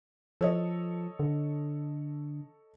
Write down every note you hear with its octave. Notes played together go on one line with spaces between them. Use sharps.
F3 A4 C#5 D#5
D3